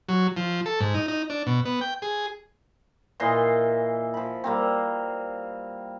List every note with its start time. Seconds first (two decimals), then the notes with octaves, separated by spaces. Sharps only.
0.09 F#3
0.37 F3
0.66 A4
0.80 G#2
0.95 D#4
1.08 D#4
1.30 D4
1.46 B2
1.65 B3
1.81 G5
2.02 G#4
3.20 A#2 E3 D#5 C6
4.14 F3 B5
4.44 G3 A#3 C4